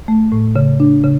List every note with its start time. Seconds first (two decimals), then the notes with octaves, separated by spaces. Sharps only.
0.08 A3
0.32 A2
0.56 C#3
0.80 D4
1.04 C#3